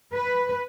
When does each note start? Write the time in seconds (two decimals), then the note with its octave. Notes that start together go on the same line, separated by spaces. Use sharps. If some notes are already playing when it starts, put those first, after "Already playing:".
0.13 B4